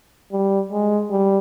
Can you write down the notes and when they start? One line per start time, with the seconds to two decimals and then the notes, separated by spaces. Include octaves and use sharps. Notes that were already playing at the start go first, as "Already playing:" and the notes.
0.32 G3
0.71 G#3
1.11 G3